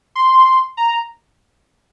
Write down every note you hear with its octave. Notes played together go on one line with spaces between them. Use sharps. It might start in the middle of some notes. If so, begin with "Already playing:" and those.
C6
A#5